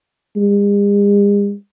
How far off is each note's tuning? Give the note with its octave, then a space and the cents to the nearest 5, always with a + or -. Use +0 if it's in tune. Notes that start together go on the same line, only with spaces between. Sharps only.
G#3 -45